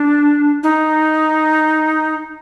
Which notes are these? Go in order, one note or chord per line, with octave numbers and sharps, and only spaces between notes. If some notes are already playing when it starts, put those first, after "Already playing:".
Already playing: D4
D#4